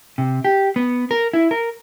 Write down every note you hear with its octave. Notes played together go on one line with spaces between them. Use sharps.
C3
G4
B3
A#4
E4
A#4